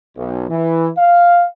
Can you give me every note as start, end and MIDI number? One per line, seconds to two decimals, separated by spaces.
0.16 0.49 35
0.49 0.88 52
0.96 1.45 77